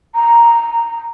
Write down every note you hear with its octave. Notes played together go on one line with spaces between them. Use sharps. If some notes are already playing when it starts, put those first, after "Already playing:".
A#5